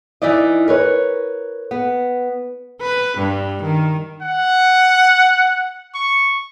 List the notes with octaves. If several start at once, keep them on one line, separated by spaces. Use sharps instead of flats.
E3 D#4 E4 D5 D#5
A#4 B4 C#5
B3
B4
G2
D#3
F#5
C#6